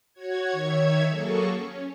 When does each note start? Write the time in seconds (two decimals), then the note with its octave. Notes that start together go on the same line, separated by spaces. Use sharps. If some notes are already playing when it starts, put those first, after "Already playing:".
0.13 F#4 C#5 G#6
0.52 D#3 C#5 E5 G#6
1.09 F#3 A#3 G#4 A4 C#6
1.54 C#4